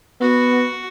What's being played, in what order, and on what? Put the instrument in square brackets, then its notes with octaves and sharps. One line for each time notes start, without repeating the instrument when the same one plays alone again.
[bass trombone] B3 [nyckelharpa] F#4